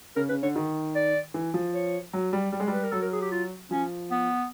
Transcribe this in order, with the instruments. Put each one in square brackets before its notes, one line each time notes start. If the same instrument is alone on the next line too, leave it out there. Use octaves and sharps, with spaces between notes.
[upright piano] C#3 [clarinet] A#4
[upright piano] C#3 [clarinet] B4
[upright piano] D3 [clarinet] C#5
[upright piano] D#3
[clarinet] D5
[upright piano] E3
F3
[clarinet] C#5
[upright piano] F#3
G3
G3
G#3
G3
[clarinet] B4
A#4
[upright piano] F#3 [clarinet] A4
[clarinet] A#4
G#4
G4
F4
[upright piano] F3 [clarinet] C#4
[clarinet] B3